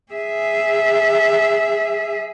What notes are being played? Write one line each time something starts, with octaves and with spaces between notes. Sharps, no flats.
G#4 E5